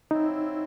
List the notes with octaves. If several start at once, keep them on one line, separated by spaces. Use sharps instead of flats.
F#3 C4 D#4 E4